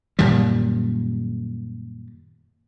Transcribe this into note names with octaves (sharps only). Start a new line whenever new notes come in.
F#2 A#2 D#3 G3